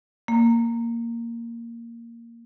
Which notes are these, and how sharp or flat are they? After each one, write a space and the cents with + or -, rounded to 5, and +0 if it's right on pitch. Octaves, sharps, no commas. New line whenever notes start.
A#3 -5